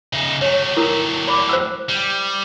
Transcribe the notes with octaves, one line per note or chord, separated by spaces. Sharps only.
C#3 D#4 E5
F#3 A3 C#5
E4 A#4 D#6
D5 B5 D6
C5 F5 E6
G3